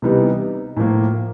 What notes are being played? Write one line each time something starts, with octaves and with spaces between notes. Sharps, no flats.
C3 E3 G3 B3 D#4
A2 F3 A#3